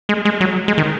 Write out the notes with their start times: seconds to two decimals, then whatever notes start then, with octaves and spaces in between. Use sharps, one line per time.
0.09 G#3
0.25 G#3
0.41 F#3
0.68 G#3
0.78 D#3